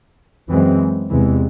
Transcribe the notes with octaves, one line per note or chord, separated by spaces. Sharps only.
F#2 E3 G#3 C4
E2 C3 E3 G#3